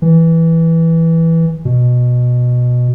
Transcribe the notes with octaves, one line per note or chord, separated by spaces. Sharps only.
E3
B2